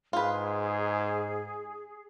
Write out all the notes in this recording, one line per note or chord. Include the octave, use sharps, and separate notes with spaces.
G#2 F4 G#4 B4